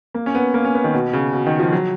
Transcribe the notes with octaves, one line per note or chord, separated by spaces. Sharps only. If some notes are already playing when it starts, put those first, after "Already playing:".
A#3
C#4
B3
A#3
C#4
B3
D#3
B2
C#3
B2
D#3
F3
F#3